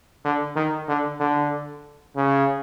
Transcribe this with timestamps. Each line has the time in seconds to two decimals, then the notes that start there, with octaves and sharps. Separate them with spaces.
0.25 D3
0.56 D#3
0.88 D3
1.20 D3
2.16 C#3